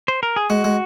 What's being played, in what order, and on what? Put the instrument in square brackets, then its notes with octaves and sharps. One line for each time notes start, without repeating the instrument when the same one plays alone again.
[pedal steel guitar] C5
A#4
G#4
[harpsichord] G#3 [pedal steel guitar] F#4
[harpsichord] G#3